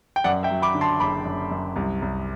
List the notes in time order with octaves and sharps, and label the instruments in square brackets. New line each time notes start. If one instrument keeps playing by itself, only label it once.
[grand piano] G5
F#2 D5 F#5
E5 G5
F#3
B5 D6
D3
A5 C6
F#1 B5 D6
F#2
F#2
C2
C2